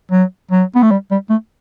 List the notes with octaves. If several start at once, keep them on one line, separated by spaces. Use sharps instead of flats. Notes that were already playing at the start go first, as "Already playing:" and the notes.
F#3
F#3
B3
A3
G3
G3
A3